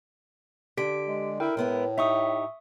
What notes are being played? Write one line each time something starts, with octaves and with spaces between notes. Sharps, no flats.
D3 G4 B6 D7
G#3
E4 A#4 G5
A2 G#3 B3 E4
D#4 G4 E5 C#6 D#6